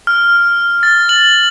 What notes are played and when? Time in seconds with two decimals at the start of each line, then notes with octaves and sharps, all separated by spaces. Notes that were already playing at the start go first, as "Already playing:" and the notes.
0.07 F6
0.83 A6
1.09 F#7